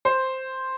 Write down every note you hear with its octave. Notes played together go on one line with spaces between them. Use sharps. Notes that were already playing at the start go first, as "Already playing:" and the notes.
C5